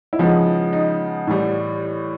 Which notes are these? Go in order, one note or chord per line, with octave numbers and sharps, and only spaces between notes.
E4
C#3 F3 G#3 B3 D#4
D#4
A2 E3 G3